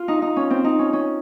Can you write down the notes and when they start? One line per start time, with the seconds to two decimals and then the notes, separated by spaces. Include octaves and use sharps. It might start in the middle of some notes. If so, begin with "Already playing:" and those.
Already playing: F4
0.08 D#4
0.22 D#4
0.36 C#4
0.50 C4
0.64 D#4
0.79 C#4
0.93 C#4